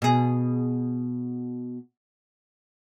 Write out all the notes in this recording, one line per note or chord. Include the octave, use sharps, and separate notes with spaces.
B2 G#4